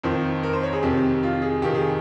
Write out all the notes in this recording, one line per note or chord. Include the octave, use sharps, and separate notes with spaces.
F2 D#3 C5
A#4
C5
C#5
G#4
F2 C3 D#3 G4
F4
G#4
F2 C3 D#3 G4
G#4